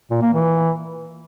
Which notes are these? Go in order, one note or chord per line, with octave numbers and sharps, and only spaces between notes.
A#2
A#3
E3